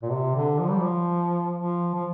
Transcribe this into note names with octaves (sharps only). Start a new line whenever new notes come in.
A#2
C3
D3
F3
G3
F3
F3
F3